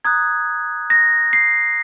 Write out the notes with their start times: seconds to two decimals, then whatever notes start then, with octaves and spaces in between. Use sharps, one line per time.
0.05 A#5 D#6 F#6 G#6
0.90 A#6
1.33 C7